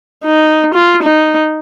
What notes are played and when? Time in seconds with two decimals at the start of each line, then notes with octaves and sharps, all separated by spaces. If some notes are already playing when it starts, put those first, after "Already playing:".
0.25 D#4
0.74 F4
1.03 D#4